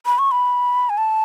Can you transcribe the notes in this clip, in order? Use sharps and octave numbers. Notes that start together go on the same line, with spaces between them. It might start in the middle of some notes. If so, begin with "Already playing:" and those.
B5
C#6
B5
G#5
A5